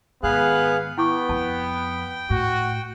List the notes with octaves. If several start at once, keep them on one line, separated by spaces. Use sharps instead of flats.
G#2 D#3 B3 G#4 F5 F#6
B3 E4 G5 C#6 D6
F2 A5
A2 F#4